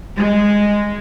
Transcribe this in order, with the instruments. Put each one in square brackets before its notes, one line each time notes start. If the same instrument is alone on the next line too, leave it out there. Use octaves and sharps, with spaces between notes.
[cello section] G#3